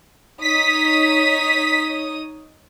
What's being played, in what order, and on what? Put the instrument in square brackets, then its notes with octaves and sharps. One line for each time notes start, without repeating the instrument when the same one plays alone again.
[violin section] D#4 C#5 D#6 [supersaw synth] B6